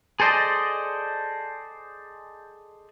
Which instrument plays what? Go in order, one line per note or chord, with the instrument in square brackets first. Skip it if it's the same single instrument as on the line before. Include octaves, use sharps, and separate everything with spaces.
[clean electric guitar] G#4 A4 C5 D5 D#5